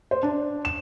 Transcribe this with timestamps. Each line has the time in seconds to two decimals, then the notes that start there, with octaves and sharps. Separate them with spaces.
0.11 C5
0.23 D4
0.65 E7